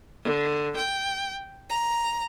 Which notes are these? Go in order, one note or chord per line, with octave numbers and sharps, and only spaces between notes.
D3
G5
A#5